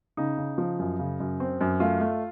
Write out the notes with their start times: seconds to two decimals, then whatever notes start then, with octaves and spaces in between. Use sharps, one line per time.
0.17 C#3 D#4
0.38 C#3
0.58 F3
0.79 F#2
0.99 C#3
1.20 F#2
1.40 C4
1.61 F#2
1.80 A3 F4
2.00 A3